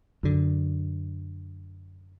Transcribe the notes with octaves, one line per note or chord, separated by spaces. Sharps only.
F#2 D3